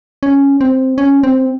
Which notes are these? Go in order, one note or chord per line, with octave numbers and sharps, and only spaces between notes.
C#4
C4
C#4
C4